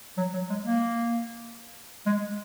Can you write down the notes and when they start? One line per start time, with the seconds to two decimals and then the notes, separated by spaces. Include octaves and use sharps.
0.17 F#3
0.34 F#3
0.49 G#3
0.65 A#3
2.06 G#3